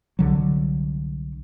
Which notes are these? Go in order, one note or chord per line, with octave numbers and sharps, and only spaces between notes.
C2 D3 F#3